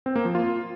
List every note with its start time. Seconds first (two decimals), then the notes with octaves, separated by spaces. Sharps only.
0.06 C4
0.16 A#3
0.25 F3
0.35 F4